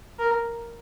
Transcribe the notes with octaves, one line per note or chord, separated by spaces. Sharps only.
A#4